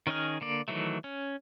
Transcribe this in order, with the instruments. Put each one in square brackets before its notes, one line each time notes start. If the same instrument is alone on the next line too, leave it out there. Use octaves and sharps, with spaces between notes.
[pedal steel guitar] D#3 C#4 D#4 G#4 F6
D3 A#3 D5
D#3 E3 F#3 A3
C#4